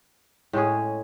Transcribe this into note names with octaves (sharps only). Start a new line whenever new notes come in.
A2 G#3 C#4 G#4